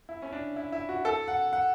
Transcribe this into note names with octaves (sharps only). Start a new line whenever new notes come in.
E4
C#4
D4
E4
E4
F#4
A4
F#5
F#5